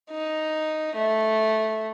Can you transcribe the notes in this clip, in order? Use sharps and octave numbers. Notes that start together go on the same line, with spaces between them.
D#4
A3